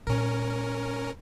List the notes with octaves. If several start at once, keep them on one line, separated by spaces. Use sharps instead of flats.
A#2 G#3 C#4 A#4